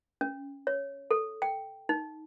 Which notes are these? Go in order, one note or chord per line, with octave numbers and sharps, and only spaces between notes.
C#4
C#5
A4
G5
D#4